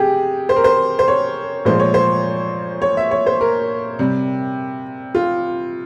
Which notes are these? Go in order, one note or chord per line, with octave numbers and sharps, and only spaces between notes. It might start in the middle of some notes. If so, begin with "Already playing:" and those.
Already playing: C3 G4 G#4
C5
A#4
C5
C5
C#5
A#2 F3 G#3 C5
C#5
C5
C#5
E5
C#5
C5
A#4
C3 G3
F4